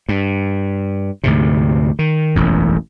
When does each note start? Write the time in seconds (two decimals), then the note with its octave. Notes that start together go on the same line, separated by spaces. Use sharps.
0.09 G2
1.24 D2 G#2 C3
1.99 D#3
2.36 E1 A1 F#2